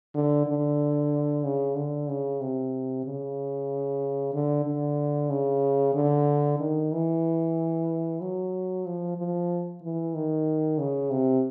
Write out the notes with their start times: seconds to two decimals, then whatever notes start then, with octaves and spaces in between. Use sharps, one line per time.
0.14 D3
0.46 D3
1.44 C#3
1.76 D3
2.08 C#3
2.41 C3
3.05 C#3
4.34 D3
4.66 D3
5.30 C#3
5.95 D3
6.59 D#3
6.92 E3
8.21 F#3
8.86 F3
9.18 F3
9.82 E3
10.15 D#3
10.78 C#3
11.11 C3